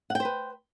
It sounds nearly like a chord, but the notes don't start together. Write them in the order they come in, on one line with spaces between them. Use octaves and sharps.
F#5 G5 C5 B4